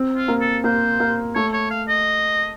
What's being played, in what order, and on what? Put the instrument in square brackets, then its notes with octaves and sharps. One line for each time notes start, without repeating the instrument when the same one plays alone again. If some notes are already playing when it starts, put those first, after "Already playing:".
Already playing: [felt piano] C4
[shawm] F4
[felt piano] A#3
[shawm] A4
[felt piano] A#3 [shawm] C5
[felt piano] A#3
[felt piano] A3 [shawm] C#5
[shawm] C#5
F5
D#5